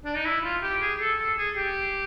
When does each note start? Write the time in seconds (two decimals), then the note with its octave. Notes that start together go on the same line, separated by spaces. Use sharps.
0.05 D4
0.16 D#4
0.25 E4
0.44 F4
0.63 G4
0.81 G#4
1.01 A4
1.19 A4
1.38 G#4
1.57 G4